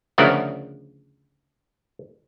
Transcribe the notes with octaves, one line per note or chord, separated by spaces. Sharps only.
D2 C#3 F3 B3 A#4 F#5